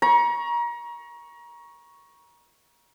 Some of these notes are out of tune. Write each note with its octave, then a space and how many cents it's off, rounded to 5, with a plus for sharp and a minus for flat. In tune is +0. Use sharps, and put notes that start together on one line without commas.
A#5 +30 C#6 +0